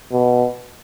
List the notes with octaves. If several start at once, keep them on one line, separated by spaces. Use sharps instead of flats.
B2